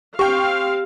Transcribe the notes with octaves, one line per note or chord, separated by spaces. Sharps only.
C4 G4 F5 G5 C#6